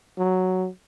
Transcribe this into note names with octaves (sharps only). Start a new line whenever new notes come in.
F#3